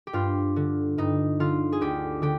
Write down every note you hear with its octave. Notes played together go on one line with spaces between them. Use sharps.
G4
G2 F4
D3
G2 D#4
D3 F4
G#4
D2 G4
D3 G4